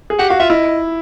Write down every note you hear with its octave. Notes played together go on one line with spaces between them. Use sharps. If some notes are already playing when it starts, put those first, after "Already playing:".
G#4
G4 F#5
F#4 F5
F4 E5
E4 D#5